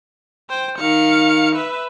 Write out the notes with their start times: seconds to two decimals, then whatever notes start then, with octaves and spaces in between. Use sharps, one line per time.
0.50 C5 G5
0.78 D#3 F5 C#7
1.56 B4 E5